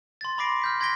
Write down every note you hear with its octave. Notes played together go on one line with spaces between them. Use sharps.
C6 A6
B5 C6 D6 A#6 C7 D7
F6 G6 B6
C6 G#6 A#6 B6 D7 G7